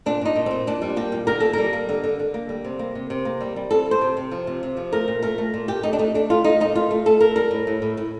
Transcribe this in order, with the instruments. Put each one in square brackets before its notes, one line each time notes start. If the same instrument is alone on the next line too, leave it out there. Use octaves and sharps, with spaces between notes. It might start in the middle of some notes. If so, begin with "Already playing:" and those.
[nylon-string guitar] A#2 D4
A#2 D#4
A#2
A#2 C4
A#2 D4
G3
A#3 G4
A#2
D3 A#4
A#3 A4
G3 A#4
A#3
D3
D3
D3
A#3
G3
C3
A#3
C3
C3
A#3
G3
G3
C3 A4
C3
C5
C3
C3
F3
C3
C3
F3
A3 A#4
A#2
A3 A#4
A3
A#2
A#2 G4
A3 D#4
D4
A3 D#4
A3 D4
A3 F4
A3 D#4
A#2 D#4
A3 F4
A3
A3 A4
A3 A#4
G3 A#4
A2
A2
A2
A2